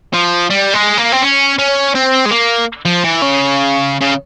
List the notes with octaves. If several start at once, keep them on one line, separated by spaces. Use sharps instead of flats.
F3
G3
G#3
A#3
C4
C#4
C#4
C4
G#3
A#3
F3
E3
C#3
C#3